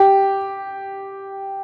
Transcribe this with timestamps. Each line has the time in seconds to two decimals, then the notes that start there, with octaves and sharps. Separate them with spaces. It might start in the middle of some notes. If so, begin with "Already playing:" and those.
Already playing: G4